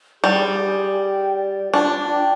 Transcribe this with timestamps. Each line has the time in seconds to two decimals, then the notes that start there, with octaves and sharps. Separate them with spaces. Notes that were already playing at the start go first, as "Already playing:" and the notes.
0.22 G3 G#4
0.61 G#4
0.98 G5
1.35 D5
1.73 D4 F4
2.10 G5